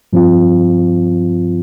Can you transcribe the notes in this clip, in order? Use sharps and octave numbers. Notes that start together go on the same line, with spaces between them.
G2 F3 C4 F4